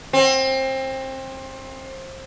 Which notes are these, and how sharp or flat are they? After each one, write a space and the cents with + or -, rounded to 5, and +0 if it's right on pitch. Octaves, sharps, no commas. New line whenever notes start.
C4 +25